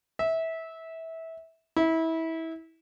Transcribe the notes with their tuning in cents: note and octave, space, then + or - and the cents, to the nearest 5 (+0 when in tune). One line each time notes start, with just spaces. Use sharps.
E5 -20
E4 -25